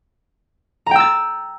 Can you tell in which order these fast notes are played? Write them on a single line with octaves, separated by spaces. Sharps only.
A#5 G5 E6 A6